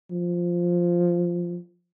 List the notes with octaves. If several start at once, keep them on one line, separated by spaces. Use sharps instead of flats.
F3